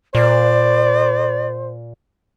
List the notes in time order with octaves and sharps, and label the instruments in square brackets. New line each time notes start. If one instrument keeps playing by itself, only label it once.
[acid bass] A#2 [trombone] C5 [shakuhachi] D5